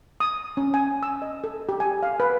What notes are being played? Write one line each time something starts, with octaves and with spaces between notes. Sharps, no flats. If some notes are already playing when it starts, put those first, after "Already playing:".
D#6
C#4
G#5
E6
D#5
A4
G4
G#5
F5
B4